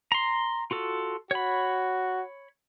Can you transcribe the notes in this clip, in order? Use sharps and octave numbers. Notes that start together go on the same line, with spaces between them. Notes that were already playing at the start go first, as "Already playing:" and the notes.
A#5 C6
F4 F#4 A4
F#4 C#5 B5